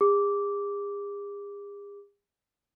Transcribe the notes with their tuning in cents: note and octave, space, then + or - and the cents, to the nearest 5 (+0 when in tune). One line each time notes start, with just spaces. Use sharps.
G#4 -45 D6 -10